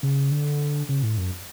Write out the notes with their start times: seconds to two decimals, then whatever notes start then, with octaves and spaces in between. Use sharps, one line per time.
0.03 C#3
0.31 D3
0.89 C#3
1.03 A2
1.18 F#2